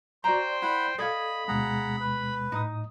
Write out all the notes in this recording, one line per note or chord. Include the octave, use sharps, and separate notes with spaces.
F#4 C5 D5 G5 A#5 C6
E4 F#5 B5
A4 D5 D#5 F5 B5 G#6
D2 B2 G#3 G#4 F#5 A#5
B4
A2 D#4 D#5 D#6